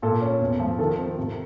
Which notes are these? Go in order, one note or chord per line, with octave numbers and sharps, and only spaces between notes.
A#2 A4
C#4
E2
F3
D#3 A4
C4
C3